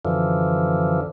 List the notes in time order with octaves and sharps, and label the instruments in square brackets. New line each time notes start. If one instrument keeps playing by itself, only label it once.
[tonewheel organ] F#2 D3 E3 F3